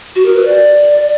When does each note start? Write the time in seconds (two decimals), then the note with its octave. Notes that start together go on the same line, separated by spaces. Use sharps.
0.16 F#4
0.25 A#4
0.35 B4
0.45 D5